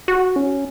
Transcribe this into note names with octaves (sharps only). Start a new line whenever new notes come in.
F#4
C#4